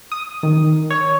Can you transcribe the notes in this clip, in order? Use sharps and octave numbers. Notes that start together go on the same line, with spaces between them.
D#6
D#3
C#5